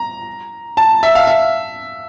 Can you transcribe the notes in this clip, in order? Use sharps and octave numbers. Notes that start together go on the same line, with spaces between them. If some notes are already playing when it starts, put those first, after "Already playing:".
Already playing: A#5
A5
E5
F5
E5